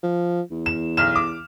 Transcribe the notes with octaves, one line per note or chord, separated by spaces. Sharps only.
F3
E2
E7
B1 F6 E7
D6